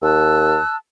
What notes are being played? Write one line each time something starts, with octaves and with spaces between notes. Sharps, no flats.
D#2 A5 E6 F#6